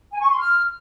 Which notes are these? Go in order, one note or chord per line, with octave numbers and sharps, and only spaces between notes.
G#5
C#6
C6
F6